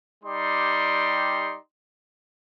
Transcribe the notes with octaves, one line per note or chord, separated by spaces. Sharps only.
G3 D#4 G4 D5 C6